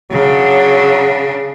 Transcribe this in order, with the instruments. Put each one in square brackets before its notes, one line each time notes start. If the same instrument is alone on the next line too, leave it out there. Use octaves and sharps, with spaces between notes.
[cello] C#3 D4 [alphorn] F#3